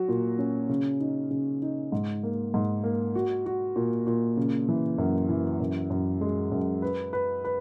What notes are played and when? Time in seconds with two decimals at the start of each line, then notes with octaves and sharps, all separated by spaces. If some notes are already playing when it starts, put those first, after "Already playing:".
Already playing: F#3 F#4
0.09 A#2
0.38 C#4
0.69 C#3
1.00 D#4
1.31 C#3
1.62 D#4
1.92 G#2
2.23 A#3
2.54 G#2
2.84 A#3
3.15 F#4
3.46 F#4
3.76 A#2
4.07 A#2
4.37 C#3
4.69 E3
4.98 F#2
5.29 E3
5.60 F#2
5.90 F#2
6.21 G#3
6.51 F#2
6.82 B4
7.13 B4
7.45 B4